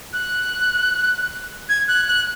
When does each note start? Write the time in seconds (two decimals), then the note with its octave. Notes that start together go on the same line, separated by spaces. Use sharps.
0.13 F#6
1.69 G#6
1.88 F#6
2.08 F#6